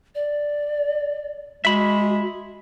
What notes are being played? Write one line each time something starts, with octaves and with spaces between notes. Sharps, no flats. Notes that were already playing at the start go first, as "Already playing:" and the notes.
D5
G#3 F#4 E5 B5